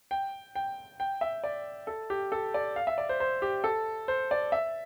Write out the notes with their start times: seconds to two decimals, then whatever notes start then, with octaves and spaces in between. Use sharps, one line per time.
0.11 G5
0.55 G5
1.00 G5
1.21 E5
1.44 D5
1.87 A4
2.10 G4
2.32 A4
2.54 D5
2.76 F5
2.87 E5
2.98 D5
3.09 C5
3.20 C5
3.42 G4
3.64 A4
4.08 C5
4.31 D5
4.52 E5